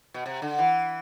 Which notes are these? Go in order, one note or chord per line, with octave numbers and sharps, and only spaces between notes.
B2
C3
D3
E3